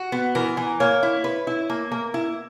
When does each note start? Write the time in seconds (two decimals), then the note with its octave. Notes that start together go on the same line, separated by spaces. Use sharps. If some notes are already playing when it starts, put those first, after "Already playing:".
Already playing: F#4
0.12 B3
0.35 E3 A#4
0.57 E3
0.80 A#3 C#5
1.03 E4
1.24 B4
1.47 E4
1.70 A#3
1.92 A#3
2.14 E4